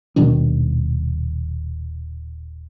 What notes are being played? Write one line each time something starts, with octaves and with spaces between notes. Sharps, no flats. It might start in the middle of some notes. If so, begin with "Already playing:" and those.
D#1 B2 D#3 D4